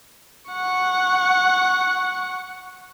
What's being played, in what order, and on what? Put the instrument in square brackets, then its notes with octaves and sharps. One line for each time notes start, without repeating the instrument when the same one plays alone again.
[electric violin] F#5 C#6